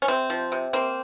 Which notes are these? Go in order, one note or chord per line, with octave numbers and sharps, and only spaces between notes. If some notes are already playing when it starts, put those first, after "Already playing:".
C#4
C3 C4
F3
C3
A#3 C4